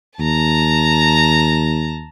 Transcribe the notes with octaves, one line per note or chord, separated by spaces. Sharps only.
D#2 A5 A#5